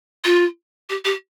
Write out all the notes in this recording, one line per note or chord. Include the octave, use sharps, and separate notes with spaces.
F4
G4
G4